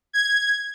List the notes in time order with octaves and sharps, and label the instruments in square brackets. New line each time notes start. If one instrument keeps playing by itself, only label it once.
[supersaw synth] G#6